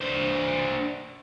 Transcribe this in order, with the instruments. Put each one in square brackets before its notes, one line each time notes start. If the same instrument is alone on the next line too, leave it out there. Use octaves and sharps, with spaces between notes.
[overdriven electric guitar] D4 C5